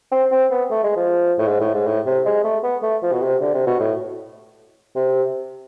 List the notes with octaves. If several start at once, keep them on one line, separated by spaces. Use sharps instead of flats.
C4
C4
B3
A3
G#3
F3
A2
G#2
A2
G#2
A2
C3
G#3
A3
B3
A3
F3
B2
C3
D3
C3
B2
A2
C3